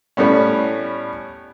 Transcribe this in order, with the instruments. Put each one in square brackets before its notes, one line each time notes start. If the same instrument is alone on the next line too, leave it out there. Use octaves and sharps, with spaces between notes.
[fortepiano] A2 G3 B3 C#4